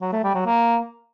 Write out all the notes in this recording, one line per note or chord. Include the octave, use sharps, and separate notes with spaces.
F#3
A3
G3
F#3
A#3